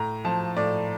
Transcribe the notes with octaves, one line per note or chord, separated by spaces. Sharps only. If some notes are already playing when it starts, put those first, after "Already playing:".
Already playing: A2 A#5
F3 A5
A2 D5